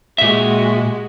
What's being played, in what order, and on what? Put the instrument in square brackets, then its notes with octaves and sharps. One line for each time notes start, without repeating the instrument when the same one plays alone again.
[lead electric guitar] A#2 E5 [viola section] G#3 F#4 G4